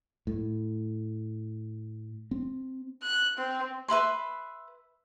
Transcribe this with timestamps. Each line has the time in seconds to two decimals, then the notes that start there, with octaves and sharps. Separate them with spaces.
0.27 A2
2.31 C4
3.03 F#6
3.38 C4
3.88 B4 E5 B5 C6